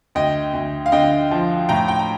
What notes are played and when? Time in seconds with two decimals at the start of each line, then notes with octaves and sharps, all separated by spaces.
0.15 D2 D#5 G5
0.53 D2
0.86 F5
0.92 D3 D#5 G5
1.31 F3
1.69 A2 G5 A#5
1.88 G5 A#5
1.99 A#5